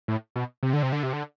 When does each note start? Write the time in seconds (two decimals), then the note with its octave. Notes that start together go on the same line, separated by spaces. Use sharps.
0.08 A2
0.36 B2
0.63 C3
0.73 D3
0.83 C3
0.92 D3
1.03 C3
1.13 D3